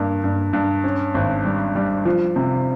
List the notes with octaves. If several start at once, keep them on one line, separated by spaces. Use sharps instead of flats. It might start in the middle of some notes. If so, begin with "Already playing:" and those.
Already playing: G2 A#3
G2
G2
C#4
G#1
G3
G3
F3
C3